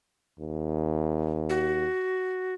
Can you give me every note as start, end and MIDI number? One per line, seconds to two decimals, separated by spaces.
0.39 1.86 39
1.49 2.54 66